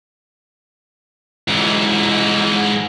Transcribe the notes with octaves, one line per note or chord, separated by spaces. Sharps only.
G#2 E3